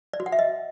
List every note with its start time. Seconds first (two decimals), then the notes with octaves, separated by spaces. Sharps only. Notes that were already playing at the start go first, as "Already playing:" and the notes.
0.13 D5
0.20 F#4
0.26 F#5
0.32 E5
0.39 D#5